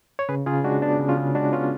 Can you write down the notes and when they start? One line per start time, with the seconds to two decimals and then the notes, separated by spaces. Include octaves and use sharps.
0.19 C#5
0.29 C#3 G#4 B4
0.46 C#3 F4 G#4
0.64 G#3 D4 F#4
0.82 B3 D4
1.00 C#3
1.09 C#4 F4
1.18 C#3
1.35 G#3 D4 F#4
1.53 B3 C#4 F4